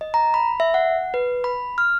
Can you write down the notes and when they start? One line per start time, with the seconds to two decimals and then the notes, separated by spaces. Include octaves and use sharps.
0.01 D#5
0.14 A#5
0.34 B5
0.60 E5
0.74 F#5
1.14 B4
1.44 B5
1.78 F6